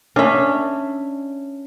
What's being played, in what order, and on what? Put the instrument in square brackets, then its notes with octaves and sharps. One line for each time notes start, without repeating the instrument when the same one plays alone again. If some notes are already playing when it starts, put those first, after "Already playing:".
[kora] C#4 [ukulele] D4 E5